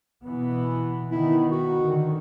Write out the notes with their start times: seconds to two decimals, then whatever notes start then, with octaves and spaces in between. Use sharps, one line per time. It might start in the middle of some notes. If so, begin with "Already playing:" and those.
0.24 B2 E3 B3
1.11 D#3 B3 E4
1.51 F#4
1.82 D3 D#3